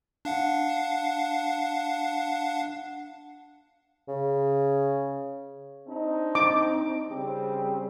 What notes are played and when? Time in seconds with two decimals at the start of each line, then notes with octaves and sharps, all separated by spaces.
0.25 D4 F5 F#5
4.08 C#3
5.87 C4 D4 D#4
6.35 D6
7.09 C#3 G3 C4